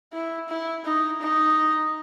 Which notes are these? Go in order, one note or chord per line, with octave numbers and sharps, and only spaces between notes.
E4
E4
D#4
D#4